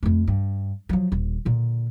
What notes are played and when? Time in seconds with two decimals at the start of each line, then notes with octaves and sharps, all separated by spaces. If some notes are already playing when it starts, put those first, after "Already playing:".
0.03 F2 A3
0.28 G2
0.89 F3 F#3
1.12 D#1
1.45 A#2 D3